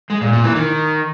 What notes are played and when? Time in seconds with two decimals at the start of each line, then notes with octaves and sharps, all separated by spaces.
0.10 G#3
0.21 A#2
0.33 A#2
0.44 E3
0.56 D#3